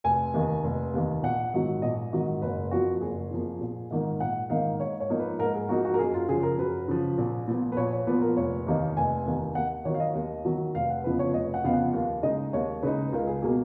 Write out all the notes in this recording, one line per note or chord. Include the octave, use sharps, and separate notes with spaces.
F1 G#5
D#2 D#3
F1
D#2 D#3
A#1 F#5
G#2 D#3 F#3
A#1 D#5
G#2 D#3 F#3
F#1 B4
F2 F3 A#3 F#4
F#1 G#4
F2 F3 A#3
A#1
G#2 D#3 A#3 D#4
A#1 F#5
G#2 D#3 A#3 D#4 F5
G#2 C#5
C#5
F3 A#3 D#4
B4
G#2 A#4
G#4
F3 A#3 D#4 F#4
F#4
A#4
F#2 G#4
F4
C#3 F3 G#4
A#4
F#2 B4
C#3 F3
A#1
A#2 F3 B3
B4
A#1 C#5
C#5
A#2 F3 B3 B4
A#4
F1 C#5
D#2 D#3 A#3 D#4
F1 G#5
D#2 D#3 A#3 D#4
D#2 F#5
D#3 F#3 C#5
F5
D#5
D#2
D#3 F#3
F1 F5
F#5
F2 C#3 F3 B3 B4
C#5
F1 D#5
F#5
F2 C#3 F3 B3 F5
F#5
D#2 F5
C#3 G#3 D#4 D#5
D#2 C#5
C#3 G#3 D#4 B4
C#2 A#4
G#4
B2 A#3 G#4